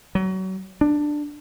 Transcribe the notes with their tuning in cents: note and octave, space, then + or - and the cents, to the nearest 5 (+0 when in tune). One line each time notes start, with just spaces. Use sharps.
F#3 +30
D4 +10